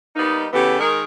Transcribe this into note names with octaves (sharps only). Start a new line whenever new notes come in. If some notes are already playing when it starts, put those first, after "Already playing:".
G3 A#3 B3 D#4
C#3 E3 A3 B3 G4
D#3 G#3 G#4 A#4